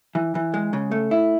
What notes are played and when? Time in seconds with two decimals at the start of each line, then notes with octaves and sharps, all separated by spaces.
0.15 E3
0.35 E3
0.54 G#3
0.73 C#3
0.91 A3
1.11 E4